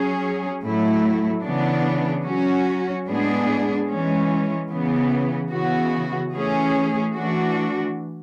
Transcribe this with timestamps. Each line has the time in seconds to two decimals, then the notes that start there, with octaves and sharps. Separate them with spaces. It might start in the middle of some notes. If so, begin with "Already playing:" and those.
Already playing: F#3 C#4 G#4
0.62 A2 F#3 A3 E4
1.43 C#3 E3 B3 D4
2.25 F#3 C#4 F#4
3.06 A2 G#3 B3 D4 G#4
3.87 E3 G#3 C#4
4.69 C#3 E3 B3
5.51 C#3 E3 B3 F#4
6.33 E3 A3 C#4 G#4
7.14 E3 A3 D4 F#4